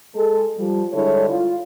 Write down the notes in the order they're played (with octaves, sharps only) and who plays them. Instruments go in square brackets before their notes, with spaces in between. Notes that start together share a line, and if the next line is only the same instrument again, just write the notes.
[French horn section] G#3 A4
F3 G3
D3 G3 G#3 E4 A4 C#5
F4